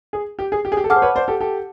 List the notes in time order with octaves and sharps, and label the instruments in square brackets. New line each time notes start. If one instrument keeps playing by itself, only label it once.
[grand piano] G#4
G4
G#4
G4
G#4
G4
A4
[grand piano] G#4 [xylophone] F#5 A5 D6 F6
[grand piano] C5
B4 C#5
C5 D5
G4 A4
G4 A4